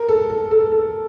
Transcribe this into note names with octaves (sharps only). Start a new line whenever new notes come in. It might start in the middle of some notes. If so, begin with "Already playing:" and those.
Already playing: A#4
A4
A4
A4
A4